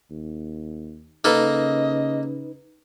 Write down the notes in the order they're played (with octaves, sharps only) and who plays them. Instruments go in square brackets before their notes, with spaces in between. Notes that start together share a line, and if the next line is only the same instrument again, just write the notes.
[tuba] D#2
[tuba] C#3 [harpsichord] A#3 A4 [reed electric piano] D#4 B4 [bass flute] D#5